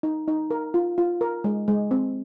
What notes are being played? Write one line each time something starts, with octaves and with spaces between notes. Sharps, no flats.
D#4
D#4
A#4
F4
F4
A#4
G#3
G#3
C4